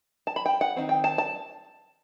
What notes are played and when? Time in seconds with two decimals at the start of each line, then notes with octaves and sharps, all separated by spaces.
0.27 A5
0.36 B5
0.46 G5
0.61 F#5
0.76 D#3 F#3 C4
0.89 G5
1.04 A5
1.18 A5